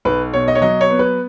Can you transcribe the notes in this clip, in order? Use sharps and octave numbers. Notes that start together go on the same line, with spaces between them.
B1 B4
B2 C#5
D#5
C#5
F#3 D#5
C#5
B3
B4